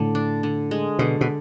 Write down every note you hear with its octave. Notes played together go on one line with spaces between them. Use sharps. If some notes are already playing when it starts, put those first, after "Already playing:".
Already playing: A2 D3
D4
D3
G#3
B2 D3
B2